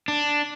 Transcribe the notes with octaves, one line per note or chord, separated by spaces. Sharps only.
D4